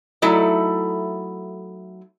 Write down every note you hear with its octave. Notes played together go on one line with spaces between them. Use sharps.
F#3 A3 D#4 E4 A4 D#5